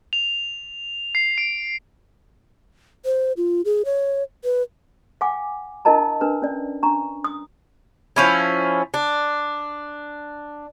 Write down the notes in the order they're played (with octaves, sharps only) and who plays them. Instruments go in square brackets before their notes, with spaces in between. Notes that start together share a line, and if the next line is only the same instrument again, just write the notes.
[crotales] F7
C7
D7
[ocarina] C5
F4
G#4
C#5
B4
[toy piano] F5 F#5 G#5 D6
D4 E4 A#4 D#5 A5 A#5
D4 A#4 B4
C#4 D5
D4 A#5 C#6
D#6
[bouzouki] F3 C#4 E4
D4